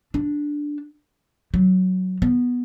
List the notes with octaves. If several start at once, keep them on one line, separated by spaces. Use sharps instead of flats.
D4
F#3
B3